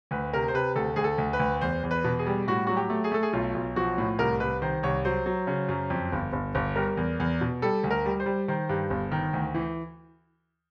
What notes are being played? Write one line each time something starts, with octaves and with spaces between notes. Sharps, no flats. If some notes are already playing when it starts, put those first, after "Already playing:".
D2 B4
C3 A#4
C5
C3 B4
D2 A4
D2 G#4
A4
D2
B4
D2
E2 C5
E2
B4
B2
G#4
G3
A2 F#4
F#3 F#4
G4
A3
G#4
A3 A4
G#4
B1 F4
B1
F3 F#4
A2
C2 A#4
C2 B4
D#3 C5
C2 C#5
F#3 C5
F#3
C#3
F#2
F2
G1
G1
G1
G3 A#4
E2
E2
B2
G3 A4
D2
A#4
G3
C5
G3
D#3 C5
G2
G1
D#3
D2
E3